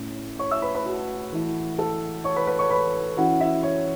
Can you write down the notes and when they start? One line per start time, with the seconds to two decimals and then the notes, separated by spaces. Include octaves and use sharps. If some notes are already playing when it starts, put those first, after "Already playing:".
Already playing: A2 A3 C#4 E4
0.39 C#5 C#6
0.51 E5 E6
0.62 B4 B5
0.75 B4 B5
0.86 F#4 F#5
1.32 E3 A3 E4
1.78 A4 A5
2.24 C#5 C#6
2.36 B4 B5
2.47 B4 B5
2.59 C#5 C#6
2.70 B4 B5
3.17 E3 C#4 E4 F#4 F#5
3.40 E4 E5
3.63 C#5